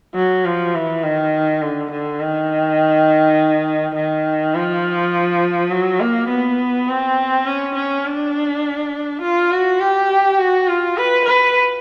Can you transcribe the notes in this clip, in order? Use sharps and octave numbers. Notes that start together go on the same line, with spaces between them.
F#3
F3
E3
D#3
D3
D3
D#3
D#3
F3
F#3
A#3
B3
C4
C#4
C#4
D4
F4
F#4
G4
F#4
F4
B4
B4